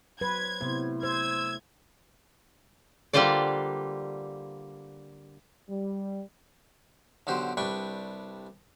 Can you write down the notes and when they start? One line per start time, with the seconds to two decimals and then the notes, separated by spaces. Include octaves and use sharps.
0.21 F#3 B4 C5 G#6
0.61 A2 C3 B3 C5
1.03 C5 E6 G#6
3.13 D3 G3 A#3 F4 C5 D5
5.70 G3
7.27 B1 D3 F#4 G4 C5
7.57 C2 G3 D4 B4 G5 C#6